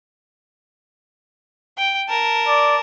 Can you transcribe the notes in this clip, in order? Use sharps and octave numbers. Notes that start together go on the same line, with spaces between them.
G5
A#4 A5
D5